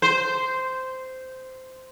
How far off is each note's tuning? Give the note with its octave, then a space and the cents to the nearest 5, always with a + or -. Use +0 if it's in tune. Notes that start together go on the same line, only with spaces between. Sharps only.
C5 -10